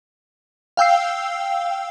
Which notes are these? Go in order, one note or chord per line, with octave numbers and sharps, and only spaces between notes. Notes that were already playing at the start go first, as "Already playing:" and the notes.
F5 G5 E6 C7